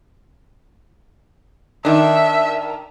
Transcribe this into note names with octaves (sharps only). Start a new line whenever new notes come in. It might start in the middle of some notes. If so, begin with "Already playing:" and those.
D#3 D4 E5